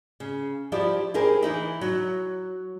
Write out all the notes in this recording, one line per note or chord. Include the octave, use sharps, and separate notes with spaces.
C#3
F3 G3 E4 G4 D5
E4 G4 G#4 A#4 C5
E3 D#4 E4
F#3